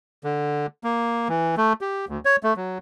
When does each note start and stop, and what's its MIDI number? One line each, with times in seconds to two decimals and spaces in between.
0.24 0.66 50
0.84 1.28 58
1.29 1.55 52
1.57 1.73 57
1.81 2.05 67
2.09 2.20 38
2.25 2.36 73
2.43 2.54 57
2.56 2.78 54